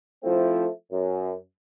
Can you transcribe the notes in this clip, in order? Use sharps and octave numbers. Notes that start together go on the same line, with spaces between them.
F3 A3 C4 E4
F#2